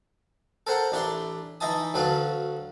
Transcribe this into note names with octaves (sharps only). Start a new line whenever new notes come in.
A4 A#4 C5 F#5 A#5
A1 D4 E5 A#5 C6
E3 D#4 D#5 E5 A5 D#6
D2 F#3 A4 B4 F5